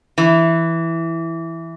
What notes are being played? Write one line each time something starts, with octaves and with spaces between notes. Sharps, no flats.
E3